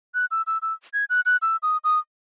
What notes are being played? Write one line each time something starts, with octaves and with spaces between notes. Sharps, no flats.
F#6
E6
E6
E6
G#6
F#6
F#6
E6
D#6
D#6